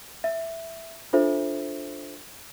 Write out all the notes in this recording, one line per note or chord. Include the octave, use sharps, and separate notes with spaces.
E5
D4 F4 A4 C5 E5